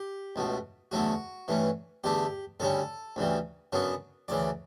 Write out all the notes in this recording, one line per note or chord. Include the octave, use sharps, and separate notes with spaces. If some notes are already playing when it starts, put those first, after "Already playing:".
Already playing: G4
C#2 B2 A3
E2 D3 F#3 A3 F#4
G2 E3 A3 C#4
E2 D3 A3 D4 G4
D2 C#3 G3 C#4 A4
D2 C#3 E3 G3
F#2 C#3 F#3 B3 D4
D2 C#3 E3 D5